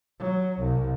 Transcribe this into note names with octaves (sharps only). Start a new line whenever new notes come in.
F#3
C2